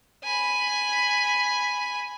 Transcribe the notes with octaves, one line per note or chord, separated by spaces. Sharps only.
G#5 B5